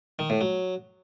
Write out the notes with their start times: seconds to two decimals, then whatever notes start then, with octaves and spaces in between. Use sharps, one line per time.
0.19 D#3
0.30 A2
0.41 F#3